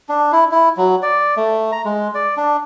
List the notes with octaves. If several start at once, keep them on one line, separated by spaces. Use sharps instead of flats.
D4
E4
E4
F#3
D5
A3
A#5
G#3
D5
D4